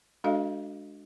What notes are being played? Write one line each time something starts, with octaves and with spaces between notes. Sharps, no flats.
G#3 D4 F#4 A4 D#5 F5